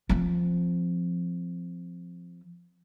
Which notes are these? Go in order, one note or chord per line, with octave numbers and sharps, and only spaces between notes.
F3 C4